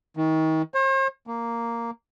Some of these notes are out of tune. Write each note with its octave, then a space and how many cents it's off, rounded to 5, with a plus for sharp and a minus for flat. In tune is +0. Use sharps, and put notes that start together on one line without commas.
D#3 +35
C5 +45
A#3 -5